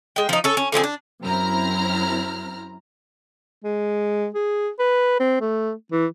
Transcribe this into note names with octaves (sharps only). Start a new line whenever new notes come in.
G#3 G5
F3 D#4
C#4 A4
C#4
D3 F3 C4 G#4
D4
F#2 C4 E4 A#5 F6
G#3
G#4
B4
C4
A3
E3